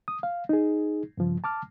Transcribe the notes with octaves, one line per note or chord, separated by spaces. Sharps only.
D#6
F5
D#4 G#4
G2 C#3 F3
A5 D6 F6